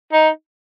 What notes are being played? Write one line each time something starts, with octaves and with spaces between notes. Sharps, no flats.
D#4